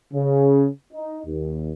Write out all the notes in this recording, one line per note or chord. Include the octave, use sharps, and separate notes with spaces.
C#3
D#4
D#2